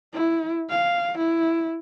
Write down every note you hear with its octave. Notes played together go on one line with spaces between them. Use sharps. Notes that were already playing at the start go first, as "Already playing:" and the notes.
E4
F5
E4